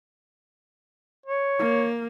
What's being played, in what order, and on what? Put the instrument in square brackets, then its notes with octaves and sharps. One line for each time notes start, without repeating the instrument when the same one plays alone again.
[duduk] C#5
[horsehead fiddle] A#3